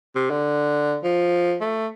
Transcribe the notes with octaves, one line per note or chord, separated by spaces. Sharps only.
C3
D3
F3
A3